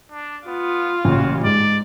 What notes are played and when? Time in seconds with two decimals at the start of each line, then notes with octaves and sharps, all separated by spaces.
0.11 D4
0.47 B3 F4
1.04 A1 A#2 C#3 F#4
1.44 G#2 G#3 D5